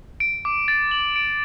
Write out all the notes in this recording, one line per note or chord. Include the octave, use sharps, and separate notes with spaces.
D7
D6
A6
F#7
D7